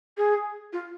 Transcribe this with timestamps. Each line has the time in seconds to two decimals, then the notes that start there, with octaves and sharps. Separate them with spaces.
0.17 G#4
0.73 F4